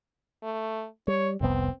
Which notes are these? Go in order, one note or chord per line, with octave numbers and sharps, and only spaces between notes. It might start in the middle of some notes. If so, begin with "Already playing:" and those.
A3
G3 C#5
F1 C2 B3 C4